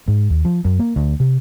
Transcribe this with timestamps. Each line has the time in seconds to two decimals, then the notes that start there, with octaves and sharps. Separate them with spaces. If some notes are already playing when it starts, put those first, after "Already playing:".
0.08 G#2
0.30 D#2
0.45 F3
0.65 F#2
0.79 A#3
0.96 D2
1.20 C3